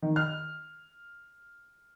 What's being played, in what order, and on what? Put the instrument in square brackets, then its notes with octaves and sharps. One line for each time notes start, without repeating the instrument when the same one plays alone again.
[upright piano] D#3
F6